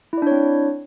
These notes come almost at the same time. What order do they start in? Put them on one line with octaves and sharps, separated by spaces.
E4 D5 D4 C#5 C4